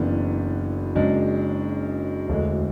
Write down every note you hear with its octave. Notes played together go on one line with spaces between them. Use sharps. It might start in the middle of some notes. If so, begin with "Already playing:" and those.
Already playing: F#1 F#2 E3 B3 D4
F#1 F#2 C#3 G#3 D4
E1 D2 D3 G#3